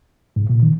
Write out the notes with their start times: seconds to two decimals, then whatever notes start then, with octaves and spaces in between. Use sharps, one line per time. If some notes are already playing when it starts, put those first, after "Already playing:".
0.36 G#2
0.49 A#2
0.62 D#3